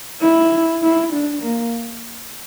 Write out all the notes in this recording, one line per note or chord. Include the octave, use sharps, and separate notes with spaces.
E4
E4
D4
A#3